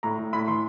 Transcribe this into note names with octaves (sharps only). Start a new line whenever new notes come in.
A2 A#5
A2
A2 B5
E3 C6